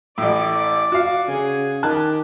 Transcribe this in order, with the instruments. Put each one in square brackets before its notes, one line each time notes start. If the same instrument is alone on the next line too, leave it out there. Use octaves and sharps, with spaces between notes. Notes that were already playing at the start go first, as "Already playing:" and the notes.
[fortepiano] A1 A2 [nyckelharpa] D5 D6
[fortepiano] F#4 F5
[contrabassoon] C#3 [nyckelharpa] G#4 G#5
[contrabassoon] D#3 [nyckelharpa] G4 G#4 [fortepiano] A5 F#6